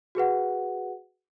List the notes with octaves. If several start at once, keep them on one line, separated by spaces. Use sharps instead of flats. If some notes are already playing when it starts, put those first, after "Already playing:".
F#4 G#4 B4 F#5